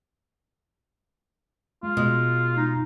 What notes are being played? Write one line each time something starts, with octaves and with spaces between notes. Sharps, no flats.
G#3 F4
B2 G#3
D#4